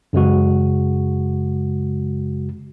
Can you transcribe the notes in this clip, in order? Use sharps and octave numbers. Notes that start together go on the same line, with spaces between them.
F#2 C#3 G#3 F#4